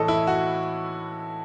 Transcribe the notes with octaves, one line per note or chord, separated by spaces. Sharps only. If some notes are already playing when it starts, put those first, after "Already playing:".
Already playing: A2 E3 A4 D#5
E4
F#4